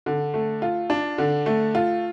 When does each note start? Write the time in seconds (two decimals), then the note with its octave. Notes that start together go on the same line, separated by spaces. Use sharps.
0.06 D3
0.34 A3
0.62 F4
0.90 D4
1.18 D3
1.46 A3
1.75 F4